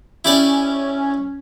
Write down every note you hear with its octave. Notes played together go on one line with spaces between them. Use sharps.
C#4 E4 G4 D5